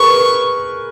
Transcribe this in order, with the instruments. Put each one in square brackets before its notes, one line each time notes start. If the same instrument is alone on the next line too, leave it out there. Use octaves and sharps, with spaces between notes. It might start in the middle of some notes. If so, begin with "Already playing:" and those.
Already playing: [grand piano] G#4 A#4 B4 [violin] C#6